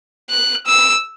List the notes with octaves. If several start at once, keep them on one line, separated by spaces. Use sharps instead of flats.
F#6
E6